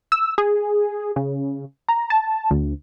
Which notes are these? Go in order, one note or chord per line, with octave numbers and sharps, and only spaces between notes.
E6
G#4
C#3
A#5
A5
D2